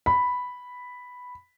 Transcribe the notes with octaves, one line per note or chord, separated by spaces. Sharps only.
B5